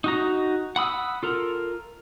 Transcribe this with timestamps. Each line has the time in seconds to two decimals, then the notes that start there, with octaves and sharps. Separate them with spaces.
0.04 D#4 F#4 A#5
0.76 F#5 B5 D#6 E6
1.23 F4 A4 A#4